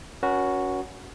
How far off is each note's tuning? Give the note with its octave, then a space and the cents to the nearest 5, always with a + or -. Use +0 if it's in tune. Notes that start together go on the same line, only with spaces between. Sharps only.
C#4 +15 F#4 +0 B4 -45